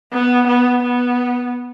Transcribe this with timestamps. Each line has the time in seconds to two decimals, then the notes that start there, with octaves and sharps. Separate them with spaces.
0.13 B3
0.48 B3
0.83 B3